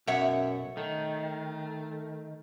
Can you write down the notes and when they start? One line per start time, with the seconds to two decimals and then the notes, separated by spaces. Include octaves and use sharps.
0.07 B1 F#2 C#5 E5 F#5
0.77 D#3 A3